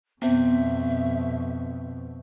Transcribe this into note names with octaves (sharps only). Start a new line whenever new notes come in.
F2 B2 B3 C4 C5 E5